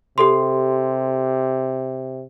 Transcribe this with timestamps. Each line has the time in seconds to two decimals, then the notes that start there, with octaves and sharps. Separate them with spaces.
0.18 C3 G4 A4 C6